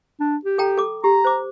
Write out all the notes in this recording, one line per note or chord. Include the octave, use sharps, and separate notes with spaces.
D4
G4
A4 G5 A#5
A4 D6
G4 A#5
C5 D6